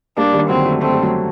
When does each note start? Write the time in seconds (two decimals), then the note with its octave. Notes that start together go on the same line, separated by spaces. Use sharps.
0.17 G3 A#3 D4
0.33 D#3 G3
0.50 D3 F#3 C4
0.65 F#3 A3
0.82 A3 C4
0.93 G3
1.02 F#3 A3